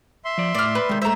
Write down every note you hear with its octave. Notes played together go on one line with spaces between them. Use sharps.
E5 C6
F3 D5
A2 D5 F6
B4
C3 D#3 G#3
A3 C5 E5 A#5